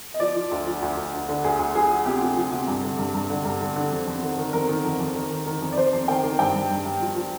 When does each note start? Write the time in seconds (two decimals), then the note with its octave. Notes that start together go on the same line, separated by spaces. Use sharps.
0.14 D#5
0.20 F3 D5
0.36 F3
0.51 D2
0.67 F3
0.82 D2
0.97 D2
1.13 D2
1.29 D3
1.44 D2 G#4
1.59 D2
1.75 F3 G#4
1.91 F3
2.06 C3 G4
2.21 F3
2.37 F3
2.52 C3
2.68 G2
2.83 D3
2.99 G2
3.14 G2
3.30 D3
3.45 G2
3.61 D3
3.76 D3
3.92 F2
4.07 F2
4.23 D#3
4.38 D#3
4.53 F2 A#4
4.69 D#3
4.85 F2
5.00 F2
5.15 D#3
5.31 D#3
5.46 D#3
5.62 F2
5.72 D5
5.77 F2 C5
5.93 F2
6.08 D#3 G5
6.24 D#3
6.39 G2 G5
6.55 G2
6.71 G2
6.85 G2
7.01 F3
7.16 F3